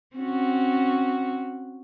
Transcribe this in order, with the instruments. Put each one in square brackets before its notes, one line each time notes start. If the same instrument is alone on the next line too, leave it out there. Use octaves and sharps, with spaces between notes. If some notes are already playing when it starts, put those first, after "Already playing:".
[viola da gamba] C4 C#4 F#4